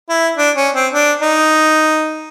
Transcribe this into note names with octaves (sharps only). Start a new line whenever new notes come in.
E4
D4
C#4
C4
D4
D#4